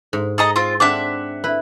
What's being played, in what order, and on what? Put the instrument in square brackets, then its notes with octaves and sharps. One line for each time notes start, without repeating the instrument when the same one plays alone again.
[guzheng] G#2
[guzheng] G#4 [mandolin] A4 D#5 A#5
[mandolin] C4 F4
[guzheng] C4 D4 [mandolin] E5 F#5 D6
[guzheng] E4 B4